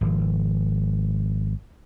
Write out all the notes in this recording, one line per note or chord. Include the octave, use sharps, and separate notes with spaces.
G#1 F3